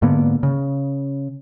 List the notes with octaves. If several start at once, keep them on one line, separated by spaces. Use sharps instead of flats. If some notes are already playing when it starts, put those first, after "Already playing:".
G#2 D3 A#3 B3
C#3